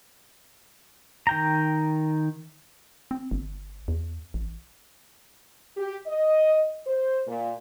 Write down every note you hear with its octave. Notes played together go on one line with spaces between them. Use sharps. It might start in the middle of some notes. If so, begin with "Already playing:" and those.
D#3 G5 A#5
C4
G1
E2
A1
G4
D#5
C5
A#2